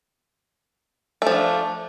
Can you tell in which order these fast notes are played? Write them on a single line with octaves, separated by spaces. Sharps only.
A3 F3 D4